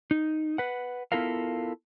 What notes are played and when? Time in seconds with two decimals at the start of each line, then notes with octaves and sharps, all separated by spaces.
0.11 D#4
0.58 B4 F#5
1.12 B3 E4 F4 A4 A#4 F5